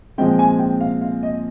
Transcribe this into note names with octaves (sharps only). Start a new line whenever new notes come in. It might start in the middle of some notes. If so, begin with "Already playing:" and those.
A#2 F3 G#3 C4 G5
G#5
G5
F5
F5
D#5